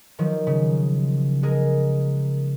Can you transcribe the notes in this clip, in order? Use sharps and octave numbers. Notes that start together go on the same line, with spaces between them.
D#3 F3 F#3
C#3
G#3 G#4 A#4